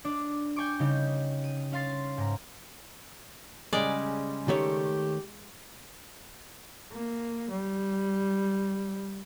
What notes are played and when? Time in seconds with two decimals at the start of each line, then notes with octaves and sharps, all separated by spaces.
0.05 D4 D5
0.56 G5 G#5 C#6 D6
0.79 C#3 G3 D#4 G4
1.44 D#7
1.72 C#4 F5 C6 A6 C7
2.18 G#2 A#5
3.73 C#3 G3 G#3 C#4 D5
4.48 D#3 A3 G4 C#5
6.92 A#3
7.50 G3